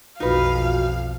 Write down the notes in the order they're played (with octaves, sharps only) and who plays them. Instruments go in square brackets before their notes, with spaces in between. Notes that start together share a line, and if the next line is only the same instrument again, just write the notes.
[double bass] B1 F2 [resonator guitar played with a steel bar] D#4 B4 [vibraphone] F4 F#4 [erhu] F5